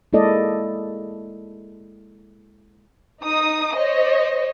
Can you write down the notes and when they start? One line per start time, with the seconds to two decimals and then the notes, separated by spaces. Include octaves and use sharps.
0.13 G#3 A#3 E4 A4 D5 D#5
3.24 D#4 D#6
3.76 C5 C#5 D#5